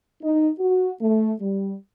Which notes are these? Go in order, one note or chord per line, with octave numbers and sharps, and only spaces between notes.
D#4
F#4
A3
G3